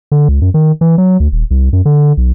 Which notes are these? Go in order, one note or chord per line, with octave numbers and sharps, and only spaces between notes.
D3
C#2
F#2
D#3
E3
F#3
D2
D#1
C2
F#2
D3
B1